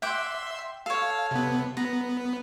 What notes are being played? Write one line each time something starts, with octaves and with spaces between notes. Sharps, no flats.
E5 F#5 G5 C6 D6
A4 C#5 F5
C3 B3
B3 A#5